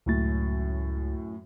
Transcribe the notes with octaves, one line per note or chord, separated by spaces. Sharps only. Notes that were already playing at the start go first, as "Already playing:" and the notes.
C#2 F#2 A2 A6